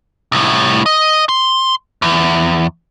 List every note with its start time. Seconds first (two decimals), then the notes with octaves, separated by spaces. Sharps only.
0.32 C2 A2
0.86 D#5
1.29 C6
2.02 E2